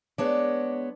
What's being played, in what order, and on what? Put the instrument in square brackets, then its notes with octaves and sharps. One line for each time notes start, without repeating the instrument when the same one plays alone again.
[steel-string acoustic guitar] G#3 B3 C#5 [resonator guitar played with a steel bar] D4